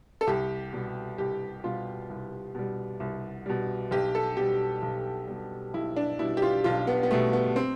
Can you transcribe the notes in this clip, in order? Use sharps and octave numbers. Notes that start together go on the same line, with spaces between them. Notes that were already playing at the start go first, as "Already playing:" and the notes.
A4
C2 G4
B2 G3
C2 G4
B2 G3 F4
C2
B2 G3
C2
B2 G3
B1 G4
A4
B2 G3 G4
B1
B2 G3
B1 E4
D4
B2 G3 E4
G4
F4
B1 F4
B3
B3
B2 G3 A3
B3
C4